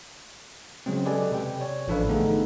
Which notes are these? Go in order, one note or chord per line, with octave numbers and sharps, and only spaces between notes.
C#3 F#3 G#3 C4
G4 A4 B4 D5 D#5 G#5
C3 G5
C#5 D5
A1 F3 D4 A4 B4 F5
D3 A3 B3 D#4 G#4 A4